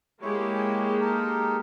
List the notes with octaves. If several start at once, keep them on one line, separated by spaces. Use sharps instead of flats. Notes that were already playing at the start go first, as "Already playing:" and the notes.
G#3 A#3 E4 G4 C#5
D#4 A4 A#4